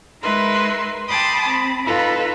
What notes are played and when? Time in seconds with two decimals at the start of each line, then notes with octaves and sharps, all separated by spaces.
0.22 G#3 D#4 A#4 B4 E5 C6
1.08 G5 A5 B5 C6 D6 D#6
1.47 C4 B5
1.85 D#4 F4 A4 B4 B5